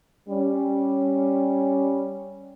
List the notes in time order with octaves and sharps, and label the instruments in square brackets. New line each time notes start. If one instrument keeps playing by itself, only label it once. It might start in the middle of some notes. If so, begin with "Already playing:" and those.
[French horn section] G3 C#4